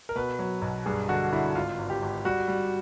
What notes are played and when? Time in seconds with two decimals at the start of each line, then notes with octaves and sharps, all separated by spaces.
0.09 A#4
0.16 B2 B4
0.39 F#3
0.62 B1
0.86 G2 G#4
1.09 D3 F#4
1.32 D3 E4
1.55 G#1 F4
1.79 G#1
1.90 G4
2.02 G#1
2.25 G3 F#4
2.48 G3